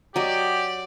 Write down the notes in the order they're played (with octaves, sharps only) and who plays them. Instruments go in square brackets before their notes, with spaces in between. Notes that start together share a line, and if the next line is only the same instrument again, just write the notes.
[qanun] F#3 D#5 [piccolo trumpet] G4 [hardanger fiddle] D5